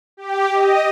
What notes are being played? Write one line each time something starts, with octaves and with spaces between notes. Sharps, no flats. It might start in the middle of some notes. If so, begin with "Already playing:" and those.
G4
D#5